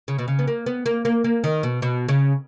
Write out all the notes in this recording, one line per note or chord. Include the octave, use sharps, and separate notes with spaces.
C#3
B2
C#3
B3
A#3
B3
A#3
A#3
A#3
D#3
B2
B2
C#3